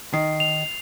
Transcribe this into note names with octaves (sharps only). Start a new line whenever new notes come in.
D#3 C7
F7